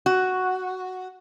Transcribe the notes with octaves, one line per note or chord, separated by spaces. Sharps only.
F#4